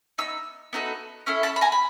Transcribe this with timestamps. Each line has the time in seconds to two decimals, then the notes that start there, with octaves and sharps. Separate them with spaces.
0.18 B3 D#4 E6
0.73 B3 D#4 F#4 A4
1.26 C#4 E4 A4 F6
1.43 A5 B5
1.56 B5
1.61 G#5 A#5
1.72 B5